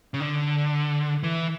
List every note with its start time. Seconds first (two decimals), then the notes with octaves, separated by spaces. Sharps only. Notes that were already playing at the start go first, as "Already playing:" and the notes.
0.14 C#3
0.20 D3
1.23 E3